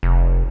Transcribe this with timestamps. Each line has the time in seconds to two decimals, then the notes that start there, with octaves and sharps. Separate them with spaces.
0.03 F1